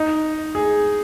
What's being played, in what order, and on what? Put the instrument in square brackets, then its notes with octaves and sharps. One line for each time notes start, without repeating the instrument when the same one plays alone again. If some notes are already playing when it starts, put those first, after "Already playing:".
Already playing: [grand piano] D#4
G#4